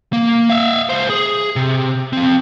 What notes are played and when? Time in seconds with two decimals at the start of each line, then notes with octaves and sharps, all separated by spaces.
0.13 A#3
0.50 E5 F5
0.89 C#2 C5
1.10 G#4
1.56 C3
2.13 F3 C4